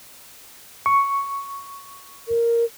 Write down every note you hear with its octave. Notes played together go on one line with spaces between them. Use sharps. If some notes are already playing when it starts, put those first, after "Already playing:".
C#6
A#4